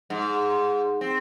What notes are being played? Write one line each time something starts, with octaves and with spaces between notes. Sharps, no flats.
G#2
C4